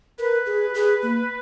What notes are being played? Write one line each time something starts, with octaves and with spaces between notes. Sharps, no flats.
A#4 B4
G#4
G#4
A#3